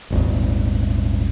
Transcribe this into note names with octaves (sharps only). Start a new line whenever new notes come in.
D#1 G#1